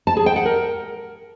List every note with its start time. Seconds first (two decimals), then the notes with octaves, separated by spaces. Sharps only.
0.07 A5
0.17 G#4
0.26 G5
0.36 F#5
0.46 A#4